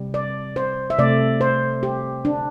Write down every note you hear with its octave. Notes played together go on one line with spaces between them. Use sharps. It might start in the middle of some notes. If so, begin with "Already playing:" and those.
Already playing: C3 G3
D5
C5
E5
C3 A3 D5
C5
G4
D4